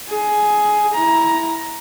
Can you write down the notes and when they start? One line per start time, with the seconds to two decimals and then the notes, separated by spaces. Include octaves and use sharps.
0.10 G#4
0.94 E4 A#5